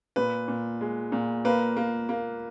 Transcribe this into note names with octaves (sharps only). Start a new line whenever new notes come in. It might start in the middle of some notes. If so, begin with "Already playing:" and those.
A#2 B4
A#2
G#3
A#2
A#3 B4
A#3
A#3